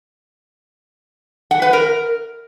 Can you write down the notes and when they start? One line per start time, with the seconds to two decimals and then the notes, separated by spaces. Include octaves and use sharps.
1.51 F#5
1.62 B4
1.73 A#4